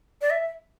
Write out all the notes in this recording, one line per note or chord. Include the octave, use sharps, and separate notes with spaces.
D5
E5